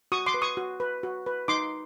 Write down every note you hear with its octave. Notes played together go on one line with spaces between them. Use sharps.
F#4 C#6 D#6
C6 D6
B4
C#6 D#6
F#4
B4
F#4
B4
D#4 C6 D6